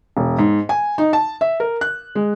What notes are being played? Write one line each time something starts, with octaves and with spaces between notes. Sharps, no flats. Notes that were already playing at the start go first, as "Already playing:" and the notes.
E1
G#2
G#5
D#4
A5
E5
A#4
F#6
G#3